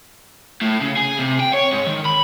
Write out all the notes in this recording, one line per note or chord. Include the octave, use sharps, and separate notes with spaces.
A2
C#3
G#4
C3
G5
C#5
G#2
D#3
B5